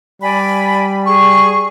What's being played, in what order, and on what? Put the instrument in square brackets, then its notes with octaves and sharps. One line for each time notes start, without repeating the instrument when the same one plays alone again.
[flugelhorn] G3 [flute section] D5 G#5 B5
[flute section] G#4 [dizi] C#6